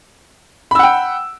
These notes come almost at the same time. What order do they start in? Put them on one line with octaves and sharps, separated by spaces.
B5 E6 F#5 G5